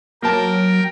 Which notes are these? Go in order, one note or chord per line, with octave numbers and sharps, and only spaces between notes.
F#3 A#3 A#4 G5 A5